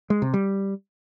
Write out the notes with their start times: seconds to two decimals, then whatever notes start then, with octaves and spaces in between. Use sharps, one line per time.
0.10 G#3
0.22 C3
0.34 G3